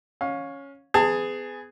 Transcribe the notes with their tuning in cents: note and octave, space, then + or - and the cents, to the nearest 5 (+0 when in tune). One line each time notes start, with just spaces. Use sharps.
C#4 +0 F5 +25
B3 +30 G#4 +0 A5 +25